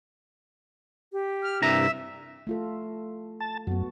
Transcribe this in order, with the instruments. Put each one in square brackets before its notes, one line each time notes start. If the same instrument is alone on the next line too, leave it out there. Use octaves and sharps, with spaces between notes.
[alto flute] G4
[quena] F6
[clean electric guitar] C2 G2 A#5 [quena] E5
[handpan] A3 F4 A4
[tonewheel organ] A5
[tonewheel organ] F#2 [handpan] B3 F#4